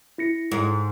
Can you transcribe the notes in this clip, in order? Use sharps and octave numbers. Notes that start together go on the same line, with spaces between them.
E4 A#6 C#7
G#2